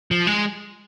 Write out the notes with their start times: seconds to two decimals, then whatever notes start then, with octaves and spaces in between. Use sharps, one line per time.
0.11 F3
0.27 G#3